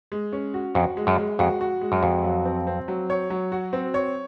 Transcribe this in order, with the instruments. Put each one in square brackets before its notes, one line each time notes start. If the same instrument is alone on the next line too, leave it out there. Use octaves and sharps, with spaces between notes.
[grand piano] G#3
C#4
F#4
[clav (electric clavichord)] F2 [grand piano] F#4
[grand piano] G#3
[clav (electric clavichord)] F#2
[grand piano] G#3
[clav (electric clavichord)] F2 [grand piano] F#4
[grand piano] F#4
G#3
[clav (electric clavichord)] F#2
[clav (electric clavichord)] F2 [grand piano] F#4
[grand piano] F#3
C4
C4
F#3
C#5
F#3
F#4
C4
C#5